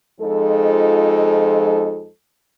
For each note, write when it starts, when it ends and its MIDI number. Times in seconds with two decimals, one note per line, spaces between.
0.21 2.09 41
0.21 2.09 53
0.21 2.09 56
0.21 2.09 63
0.21 2.09 69